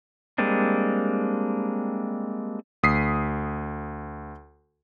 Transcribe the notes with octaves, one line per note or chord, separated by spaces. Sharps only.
G3 G#3 A#3 C4 D4
D2 D#6 B6 C7